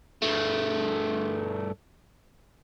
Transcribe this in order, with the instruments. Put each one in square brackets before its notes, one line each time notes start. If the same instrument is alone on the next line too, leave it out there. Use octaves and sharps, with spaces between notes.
[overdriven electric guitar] G2 A3